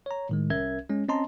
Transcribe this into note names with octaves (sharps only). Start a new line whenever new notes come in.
C#5 A#5
A2 D#3 G#3
C2 C#4 A#4 E5 G#6
G#3 C#4
C4 C#4 D#5 A5 A#5 C6